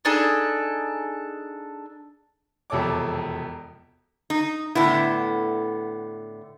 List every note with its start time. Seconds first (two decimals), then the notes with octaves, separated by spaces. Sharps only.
0.05 D4 D#4 G#4 A4
2.70 E1 F2 C3 A4 C#5 D6
4.30 D#4
4.75 A2 D3 B3 E4